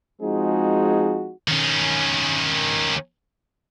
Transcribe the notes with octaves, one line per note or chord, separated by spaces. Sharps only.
F3 G#3 C4 D#4 F#4 G#4
D#3 C#4